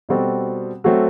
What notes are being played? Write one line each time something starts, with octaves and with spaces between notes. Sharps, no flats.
B2 G3 C4 F#4 A4
F#3 A3 C4 F#4 A4